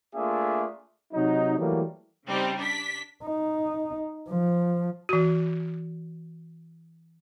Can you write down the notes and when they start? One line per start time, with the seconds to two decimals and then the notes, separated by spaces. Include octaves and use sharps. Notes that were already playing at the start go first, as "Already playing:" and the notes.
0.15 A3 A#3 D4 F4 G#4 E5
1.13 C3 F#3 D#4
1.58 E3 F#3 G3 A3 A#3
2.28 C#3 G3 C4 D#4
2.58 D4 B6
3.24 D#4
4.29 F3
5.09 E3 F#4